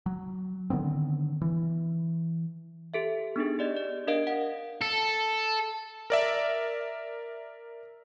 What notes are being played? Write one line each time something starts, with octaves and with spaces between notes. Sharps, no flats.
F#3
D3 D#3 B3 C4
E3
G4 A4 E5
B3 D4 D#4 G#4
G4 D5 D#5
D5
D4 A#4 D#5 F5 D7
F#5
A4
A#4 D5 E5